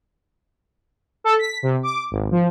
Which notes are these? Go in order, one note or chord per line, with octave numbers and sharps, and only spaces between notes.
A4
B6
C3
D6
G#1
F3